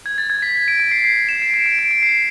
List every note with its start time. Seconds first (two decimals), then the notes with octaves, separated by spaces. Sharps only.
0.06 G#6
0.18 A6
0.30 G#6
0.42 B6
0.55 B6
0.68 D7
0.80 D7
0.92 C7
1.04 C7
1.29 E7
1.42 D7
1.54 D7
1.66 D7
1.79 D7
1.91 D7
2.03 C7